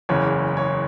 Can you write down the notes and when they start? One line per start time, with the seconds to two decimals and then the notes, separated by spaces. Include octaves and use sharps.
0.09 F#1 E2 C#3 E3 C#5
0.57 C#5